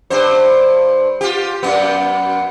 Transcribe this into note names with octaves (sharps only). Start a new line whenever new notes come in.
G2 C5
F4 G4
F#2 B3